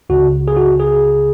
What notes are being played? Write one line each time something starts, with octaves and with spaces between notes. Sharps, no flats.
C#2 C#3 F#4
G#4
F#4
G#4